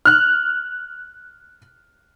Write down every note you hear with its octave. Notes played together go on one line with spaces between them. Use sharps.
F6 F#6